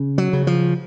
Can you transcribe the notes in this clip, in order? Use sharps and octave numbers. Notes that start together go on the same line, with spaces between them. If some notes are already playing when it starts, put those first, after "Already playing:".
Already playing: C#3
F#3
C#3
F3